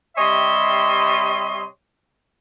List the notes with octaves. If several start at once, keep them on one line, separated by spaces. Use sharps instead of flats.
C3 G3 C#5 D#5 E5 C6